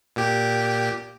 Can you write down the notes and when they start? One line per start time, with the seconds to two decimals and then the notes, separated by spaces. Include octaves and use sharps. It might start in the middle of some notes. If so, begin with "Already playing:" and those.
0.16 A#2 G4